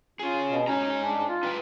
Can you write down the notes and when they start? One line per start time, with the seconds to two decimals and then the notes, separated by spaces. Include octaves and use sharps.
0.19 C#4 F4 G#4
0.51 B2
0.67 G#2 C#4 D#4 A#5
1.04 D4
1.29 F4
1.43 D#4 B4 G5